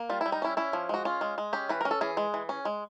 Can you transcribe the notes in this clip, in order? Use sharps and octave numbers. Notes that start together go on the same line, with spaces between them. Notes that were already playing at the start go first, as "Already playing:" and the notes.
Already playing: A#3
G3 F4
G3 E4
D#4
C#4 E4
C#4 E4
F3
G#3 F#4
C#4 F4
G#3
G#3
C#4 G4
E3 B4
C#4 A#4
A4
E3 G#4
G#3
E3
C#4
G#3